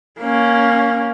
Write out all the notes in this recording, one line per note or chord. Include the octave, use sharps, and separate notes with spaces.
A#3 C#4